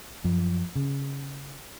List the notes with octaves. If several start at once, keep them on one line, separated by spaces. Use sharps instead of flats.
F#2 F3
C#3